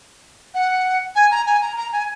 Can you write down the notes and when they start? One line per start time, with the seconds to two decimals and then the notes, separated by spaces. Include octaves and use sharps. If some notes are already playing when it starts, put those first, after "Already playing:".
0.54 F#5
1.16 G#5
1.31 A#5
1.46 G#5
1.62 A#5
1.77 A#5
1.93 G#5